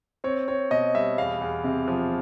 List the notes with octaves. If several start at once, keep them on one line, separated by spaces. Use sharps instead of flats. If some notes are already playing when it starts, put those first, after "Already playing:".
C4 C#5
C4 C#5
B2 D#5
G3 E5
E2 F5
E2
C3
F3